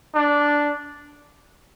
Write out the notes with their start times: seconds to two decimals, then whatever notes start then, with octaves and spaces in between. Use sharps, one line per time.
0.15 D4